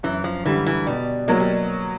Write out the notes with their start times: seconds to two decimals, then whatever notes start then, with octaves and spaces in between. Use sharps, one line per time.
0.03 F#2 E3
0.24 F3
0.45 D3 E3 G3
0.66 E3
0.87 B2 G3
1.28 F#3 G#3 A#3
1.40 G3